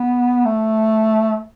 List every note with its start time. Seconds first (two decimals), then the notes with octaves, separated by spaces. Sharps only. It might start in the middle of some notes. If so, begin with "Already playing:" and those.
Already playing: B3
0.45 A3